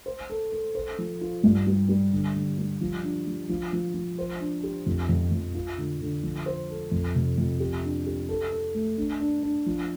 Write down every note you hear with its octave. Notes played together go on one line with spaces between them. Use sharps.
C5
A4
A4
C5
F3
F4
G2
G3
G3
D3
D3
G3
F3
D4
F3
F3
F3
F3
C5
D4
G4
F2
F2
F2
F4
D3
D3
F3
C5
A4
F2
C3
F2
G4
D4
G4
A4
A4
A3
D4
D4
D4
F3